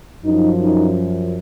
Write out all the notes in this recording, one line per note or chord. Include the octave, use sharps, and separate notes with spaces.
F#2 F3 D#4
D#4